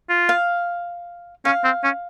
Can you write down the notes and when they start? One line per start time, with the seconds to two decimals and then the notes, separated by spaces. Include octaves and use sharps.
0.09 F4
0.29 F5
1.45 C#4 F5
1.64 C4
1.84 C#4